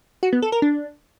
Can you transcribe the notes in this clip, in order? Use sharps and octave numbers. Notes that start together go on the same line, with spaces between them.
F#4
B3
A4
A#4
D4